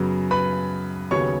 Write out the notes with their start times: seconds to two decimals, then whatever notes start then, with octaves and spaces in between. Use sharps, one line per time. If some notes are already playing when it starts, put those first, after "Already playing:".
Already playing: F#2 C#3 F#3 B3
0.31 B4 B5
1.11 D#2 C#3 F#3 B3 C#5 C#6